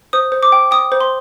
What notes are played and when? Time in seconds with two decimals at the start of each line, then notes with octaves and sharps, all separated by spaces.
0.13 C5 D#6
0.32 C5
0.43 D6
0.52 G5
0.71 G5 D#6
0.92 C5
1.01 C6